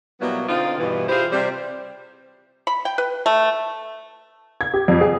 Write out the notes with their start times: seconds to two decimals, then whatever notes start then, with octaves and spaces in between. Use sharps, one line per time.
0.21 B2 F#3 G3 A#3 B3 E4
0.48 D3 C4 D#4 F4
0.78 G2 B2 E3
1.09 E4 F4 G4 G#4 C5
1.32 C3 G3 C5
2.67 B5
2.85 G5
2.98 B4
3.26 A3
4.61 G#6
4.74 G4
4.88 F2
5.01 G#4